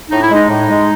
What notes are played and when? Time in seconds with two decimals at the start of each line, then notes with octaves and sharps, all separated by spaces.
0.10 A2 D#4
0.22 E4
0.30 G#3 D#4
0.49 A2
0.69 G#3